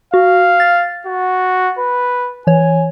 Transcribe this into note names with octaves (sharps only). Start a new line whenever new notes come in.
F#4 F5
A6
F#4
B4
E3 C#5 G#5